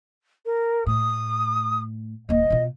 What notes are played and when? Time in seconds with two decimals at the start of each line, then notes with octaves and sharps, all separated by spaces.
0.45 A#4
0.86 A2 D#6
2.29 D#1 A#3 D#5
2.50 B2 F4